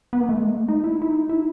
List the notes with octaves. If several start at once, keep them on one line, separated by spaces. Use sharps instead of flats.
B3
A#3
A3
G#3
A#3
A3
D#4
E4
E4
D#4
E4